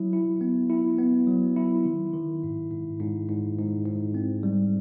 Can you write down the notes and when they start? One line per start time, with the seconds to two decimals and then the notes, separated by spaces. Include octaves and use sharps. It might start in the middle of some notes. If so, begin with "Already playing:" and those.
Already playing: F#3 E4
0.13 E4
0.41 B3
0.70 E4
0.99 B3
1.27 F#3
1.56 E4
1.85 D#3
2.13 D#3
2.43 G#2
2.71 G#2
3.00 G#2
3.29 G#2
3.58 G#2
3.86 G#2
4.14 C4
4.43 G3